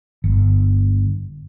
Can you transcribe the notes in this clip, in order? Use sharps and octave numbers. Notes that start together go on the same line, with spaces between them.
G1